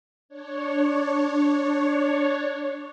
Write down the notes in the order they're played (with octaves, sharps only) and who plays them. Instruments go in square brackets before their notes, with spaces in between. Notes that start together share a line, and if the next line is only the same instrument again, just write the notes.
[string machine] D4 C#5